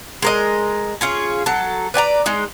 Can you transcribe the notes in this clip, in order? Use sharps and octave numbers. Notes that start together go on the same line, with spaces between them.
G#3 A#4 D#5
C#4 F4 G#4
F#3 A4
B4 D5 G5 A#5
G#3 D#4